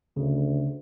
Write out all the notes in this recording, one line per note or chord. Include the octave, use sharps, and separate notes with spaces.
D2 C#3